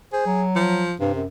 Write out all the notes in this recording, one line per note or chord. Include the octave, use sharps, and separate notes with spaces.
G#4 C5
F#3
F3
G2 C3
F#2